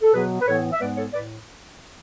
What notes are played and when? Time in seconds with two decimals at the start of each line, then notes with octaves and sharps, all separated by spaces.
0.02 A4
0.13 B2 F#3 B3 G#4 B4
0.41 B4
0.47 A2 E3 B3 A4 C#5
0.73 E5
0.80 G#2 G#3 B3 B4 D5
0.97 A4 C#5
1.13 A2 B4 D5